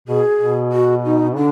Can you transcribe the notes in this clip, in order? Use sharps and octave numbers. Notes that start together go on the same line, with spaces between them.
B2 G#4
B2
F#4
D#4
D3 D4